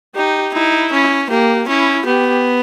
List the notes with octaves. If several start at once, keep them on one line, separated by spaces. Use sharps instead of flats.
D#4 G4
D#4 E4
C#4
A#3 G4
C#4 E4
B3 G4